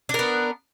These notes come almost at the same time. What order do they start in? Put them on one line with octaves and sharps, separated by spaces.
D4 A#4 B3